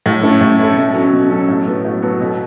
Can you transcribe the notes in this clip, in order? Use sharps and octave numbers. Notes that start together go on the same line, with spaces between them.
A2
A3 C#4 E4 A4
A2
A3 C#4 E4 A4
B2
F#3 C#4 A4
B2
F#3 C#4 A4
A2
F#3 B3 A4
A2
F#3 B3 A4
B2